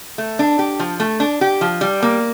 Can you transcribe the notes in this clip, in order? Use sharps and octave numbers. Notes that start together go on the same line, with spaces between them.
A3
D4
G4
F3
A3
D4
G4
F3
G3
A#3